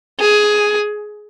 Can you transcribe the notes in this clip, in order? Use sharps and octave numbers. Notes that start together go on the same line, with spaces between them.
G#4